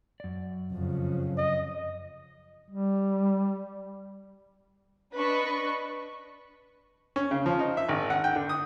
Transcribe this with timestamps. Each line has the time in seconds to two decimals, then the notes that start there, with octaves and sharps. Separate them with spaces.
0.20 F#2 D5
0.73 F2 C#3
1.38 D#5
2.70 G3
5.14 D4 B4 D#5 B5 C#6
7.16 C#4
7.31 C#3
7.46 F3
7.59 D#4
7.77 E5
7.89 G#1
8.10 F#5
8.24 G5
8.36 D3
8.49 D#6